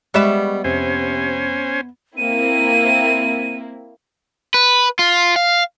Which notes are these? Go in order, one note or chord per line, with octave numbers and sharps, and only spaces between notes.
G3 G#3 B3 D#5 E5 C#6
F2 C3 C#4 C5 G#5
A#3 C4 E4 D#7
B4
F4
F5